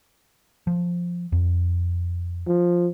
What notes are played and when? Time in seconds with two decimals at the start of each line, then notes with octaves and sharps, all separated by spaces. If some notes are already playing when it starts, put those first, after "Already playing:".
0.67 F3
1.32 F2
2.47 F3